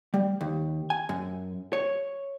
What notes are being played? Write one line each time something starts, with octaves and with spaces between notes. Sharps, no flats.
G3
D#2
G#5
F#2
C#5